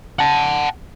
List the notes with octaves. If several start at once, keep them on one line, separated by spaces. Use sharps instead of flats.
F#5 A5